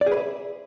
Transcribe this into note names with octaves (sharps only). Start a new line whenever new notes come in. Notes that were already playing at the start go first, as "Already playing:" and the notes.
D5
G#4
B4
E5